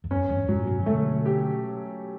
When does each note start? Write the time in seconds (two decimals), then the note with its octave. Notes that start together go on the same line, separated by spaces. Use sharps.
0.04 E2
0.10 F#2 C#4
0.29 E2 G2
0.48 F#2 A2 F#3
0.67 G2 B2
0.83 E3
0.86 B2 D3 A3
1.26 G4